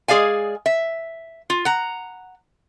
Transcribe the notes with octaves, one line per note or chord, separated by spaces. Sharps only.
G#3 G#4 D5 F5 G#5
E5
F4
F#5 A#5